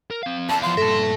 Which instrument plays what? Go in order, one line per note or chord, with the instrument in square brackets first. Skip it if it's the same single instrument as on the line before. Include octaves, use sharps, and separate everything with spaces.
[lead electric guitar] A#4
C4 F5
[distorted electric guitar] E2 [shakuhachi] A5
[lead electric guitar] F3 F5 [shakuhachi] C6
[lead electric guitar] G2 A#2 [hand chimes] A4 A#6 [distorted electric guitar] E5 A5